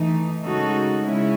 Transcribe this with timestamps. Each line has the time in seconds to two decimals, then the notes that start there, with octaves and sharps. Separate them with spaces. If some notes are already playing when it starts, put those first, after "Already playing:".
Already playing: E3 A3 D#4
0.43 C#3 G#3 D#4 F#4 A4
1.05 C#3 G#3 C#4 E4